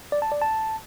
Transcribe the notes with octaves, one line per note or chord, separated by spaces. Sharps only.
D5
A5
D5
A5